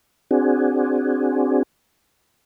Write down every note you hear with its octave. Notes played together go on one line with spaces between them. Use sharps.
C4 D4 F#4 G#4